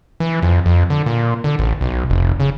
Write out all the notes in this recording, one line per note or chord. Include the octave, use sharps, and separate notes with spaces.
E3
F2
F2
D3
A#2
D3
A1
B1
F1
C#3